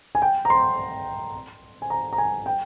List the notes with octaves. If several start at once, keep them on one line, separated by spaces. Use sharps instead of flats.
G#5
G5
A#5
C6
G#5
A#5
A#5
G#5
G5